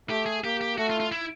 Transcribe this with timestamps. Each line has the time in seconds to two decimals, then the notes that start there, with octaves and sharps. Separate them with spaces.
0.09 A3 G4
0.26 G#4
0.44 A#3 G4
0.61 G4
0.78 A3 F#4
0.90 F4
1.00 F4
1.12 E4